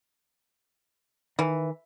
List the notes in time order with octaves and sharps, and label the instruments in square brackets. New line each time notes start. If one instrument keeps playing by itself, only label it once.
[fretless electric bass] D#3 [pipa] E3